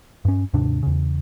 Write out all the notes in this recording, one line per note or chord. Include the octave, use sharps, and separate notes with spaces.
G2 C#4
D#2 G#2 C3 D4
E2 C#3